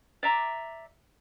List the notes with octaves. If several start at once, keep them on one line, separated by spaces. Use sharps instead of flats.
D5 E5 A#5 D6